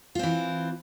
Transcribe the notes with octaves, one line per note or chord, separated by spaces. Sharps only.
E3 C4 F4